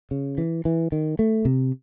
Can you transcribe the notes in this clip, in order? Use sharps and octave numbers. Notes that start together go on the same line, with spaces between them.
C#3
E3
E3
D#3
A3
C3